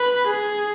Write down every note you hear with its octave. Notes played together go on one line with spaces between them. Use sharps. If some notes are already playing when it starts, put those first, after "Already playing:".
Already playing: B4
G#4